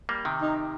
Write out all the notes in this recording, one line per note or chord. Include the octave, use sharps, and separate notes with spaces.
G3 A#3
C3 D#3
D#4